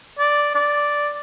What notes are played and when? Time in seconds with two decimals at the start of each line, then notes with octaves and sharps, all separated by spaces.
0.19 D5
0.55 D5